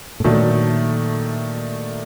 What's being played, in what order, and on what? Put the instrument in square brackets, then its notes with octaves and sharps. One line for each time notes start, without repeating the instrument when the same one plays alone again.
[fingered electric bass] A2
[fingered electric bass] A#2 [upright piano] D#3 F#3 A3 D4